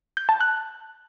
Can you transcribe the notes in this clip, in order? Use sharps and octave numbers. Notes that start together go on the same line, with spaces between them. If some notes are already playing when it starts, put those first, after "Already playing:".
G6
A5
F#6